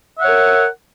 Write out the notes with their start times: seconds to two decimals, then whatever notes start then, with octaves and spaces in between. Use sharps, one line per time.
0.17 E5
0.20 F#5
0.24 C#5
0.27 A#4